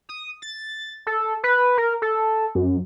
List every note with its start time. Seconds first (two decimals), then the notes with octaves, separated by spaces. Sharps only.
0.09 D#6
0.42 A6
1.07 A4
1.43 B4
1.78 A#4
2.02 A4
2.55 F#2